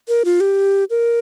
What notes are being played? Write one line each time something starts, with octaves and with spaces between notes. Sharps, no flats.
A#4
F4
G4
A#4